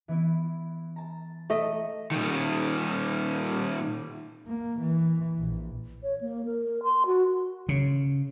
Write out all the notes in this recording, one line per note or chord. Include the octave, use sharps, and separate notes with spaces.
E3 B3 E4
A5 A#5
A3 D#5
A#2 D#3
A#3
E3
A#1
C#5
A#3
A#4
C6
F#4
C#3